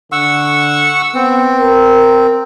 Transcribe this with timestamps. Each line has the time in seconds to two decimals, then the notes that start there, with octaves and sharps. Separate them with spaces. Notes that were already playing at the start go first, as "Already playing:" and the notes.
0.12 D3 F#5 C#6 E6
1.15 B3 C4
1.61 A#4